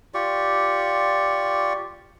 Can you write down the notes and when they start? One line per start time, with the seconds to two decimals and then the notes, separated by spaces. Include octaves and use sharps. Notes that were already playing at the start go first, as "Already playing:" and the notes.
0.14 F4 G4 D5 C#6